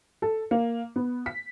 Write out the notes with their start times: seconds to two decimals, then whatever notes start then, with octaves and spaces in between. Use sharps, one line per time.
0.22 A4
0.51 A#3
0.96 B3
1.26 B6